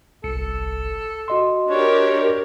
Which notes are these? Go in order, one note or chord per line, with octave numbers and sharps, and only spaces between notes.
G1 C2 A4 C#7
F#4 D#5 C6
D4 G4 A#4 C#5